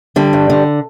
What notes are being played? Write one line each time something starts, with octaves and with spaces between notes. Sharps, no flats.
D3 G3
G2
D3